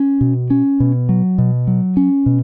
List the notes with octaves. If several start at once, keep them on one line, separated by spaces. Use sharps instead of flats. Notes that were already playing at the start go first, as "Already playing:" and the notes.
Already playing: C#4
B2
C#4
B2
F#3
B2
F#3
C#4
B2